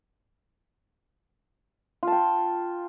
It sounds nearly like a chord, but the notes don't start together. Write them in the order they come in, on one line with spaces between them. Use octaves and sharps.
F4 A5 G5